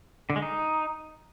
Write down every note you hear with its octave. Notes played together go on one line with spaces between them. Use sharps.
D3
G#3
D#4